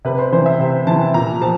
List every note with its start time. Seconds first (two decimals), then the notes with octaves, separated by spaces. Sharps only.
0.05 C3 B4
0.18 C5
0.32 E3 C5
0.46 E5
0.60 C3
0.87 E3 A5
1.14 A#2 A#5
1.41 F3 A5